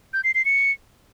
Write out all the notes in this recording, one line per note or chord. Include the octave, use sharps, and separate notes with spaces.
G6
C7
C7
C#7